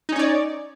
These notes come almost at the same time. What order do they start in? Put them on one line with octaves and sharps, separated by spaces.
D#4 C#4 C#5 D5